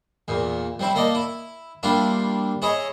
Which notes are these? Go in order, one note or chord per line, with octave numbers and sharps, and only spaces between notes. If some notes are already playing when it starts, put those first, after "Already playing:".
E2 A#2
G3 C4 E4
A#3 A4 D5 D#5
E4
G3 A#3 D4 E4 F4
E4 G#4 C#5 D#5 E5